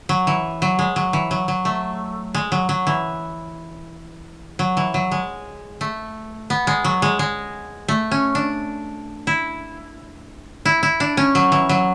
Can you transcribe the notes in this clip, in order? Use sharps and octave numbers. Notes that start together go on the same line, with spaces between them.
F#3
E3
F#3
G#3
F#3
E3
F#3
F#3
A3
G#3
F#3
F#3
E3
F#3
E3
F#3
G#3
A3
B3
G#3
F#3
G#3
G#3
A3
C#4
D4
E4
E4
E4
D4
C#4
F#3
E3
F#3